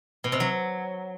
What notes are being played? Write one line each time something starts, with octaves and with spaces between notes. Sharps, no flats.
B2
C3
F#3